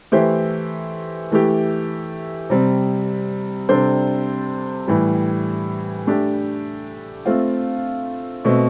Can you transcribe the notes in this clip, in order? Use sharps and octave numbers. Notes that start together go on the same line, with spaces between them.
E3 A3 E4 G4 C5
E3 A3 E4 G4
C3 G3 C4
C3 G3 D4 A4 C5
A2 E3 G3
A3 D4 G4
A3 C4 F4
B2 A3 C4